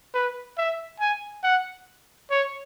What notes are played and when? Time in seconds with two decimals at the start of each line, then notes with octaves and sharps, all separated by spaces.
0.14 B4
0.57 E5
1.00 G#5
1.43 F#5
2.30 C#5